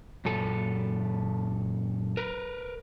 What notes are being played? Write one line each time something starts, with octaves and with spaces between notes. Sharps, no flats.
F#2 A#2 A4
A#4 B4